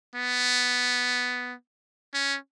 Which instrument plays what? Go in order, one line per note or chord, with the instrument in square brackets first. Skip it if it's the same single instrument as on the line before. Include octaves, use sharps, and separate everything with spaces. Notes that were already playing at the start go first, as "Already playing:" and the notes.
[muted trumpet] B3
C#4